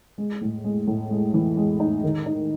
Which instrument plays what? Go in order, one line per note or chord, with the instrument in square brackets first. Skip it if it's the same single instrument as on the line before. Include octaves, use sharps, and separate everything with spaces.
[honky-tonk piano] G#3
A2
G#3
A2
G#3
E3
G#3
D#4
D#3
D#4